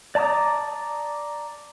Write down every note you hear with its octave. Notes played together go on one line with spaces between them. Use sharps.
D5 A5 A#5 D6 D#6